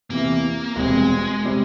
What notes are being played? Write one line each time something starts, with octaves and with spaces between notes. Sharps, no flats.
E2 C3 E3 A#3
E1 E2 C3 G3 G#3 C4
C3 G3 C4